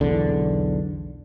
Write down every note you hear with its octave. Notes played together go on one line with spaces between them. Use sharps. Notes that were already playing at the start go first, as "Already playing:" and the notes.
B1 E2 D3